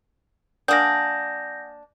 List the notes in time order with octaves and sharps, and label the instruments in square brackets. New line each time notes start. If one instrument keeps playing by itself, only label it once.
[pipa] A#3 D4 [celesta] F#5 G#5 D#6 [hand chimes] G6 A#6